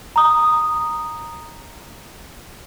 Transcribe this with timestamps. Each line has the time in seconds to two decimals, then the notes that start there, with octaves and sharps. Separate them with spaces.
0.16 A#5 D#6